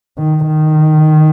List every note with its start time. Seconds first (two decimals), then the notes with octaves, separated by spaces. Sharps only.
0.18 D#3
0.47 D#3